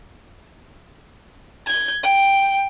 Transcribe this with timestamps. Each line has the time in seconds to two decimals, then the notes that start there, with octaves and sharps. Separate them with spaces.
1.67 G6 G#6
2.03 G5